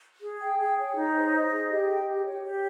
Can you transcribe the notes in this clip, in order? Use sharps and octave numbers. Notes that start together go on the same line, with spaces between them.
G#4
G5
G#4
C#5
D#4
C5
D#5
G#4
G4
G5
G4
C#5
G4